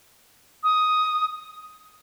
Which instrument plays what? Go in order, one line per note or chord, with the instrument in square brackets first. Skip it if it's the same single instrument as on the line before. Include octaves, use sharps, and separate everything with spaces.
[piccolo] D#6